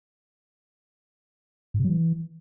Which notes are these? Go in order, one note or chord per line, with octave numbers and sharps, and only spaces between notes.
G#2
C3
F#3
E3